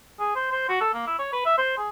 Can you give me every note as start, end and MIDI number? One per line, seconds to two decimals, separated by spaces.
0.20 0.35 68
0.36 0.51 72
0.52 0.67 72
0.69 0.81 66
0.81 0.89 69
0.94 1.07 58
1.07 1.18 64
1.19 1.29 73
1.33 1.45 71
1.45 1.56 76
1.58 1.77 72
1.77 1.90 68